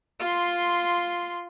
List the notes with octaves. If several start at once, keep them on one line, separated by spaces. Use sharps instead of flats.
F4 C6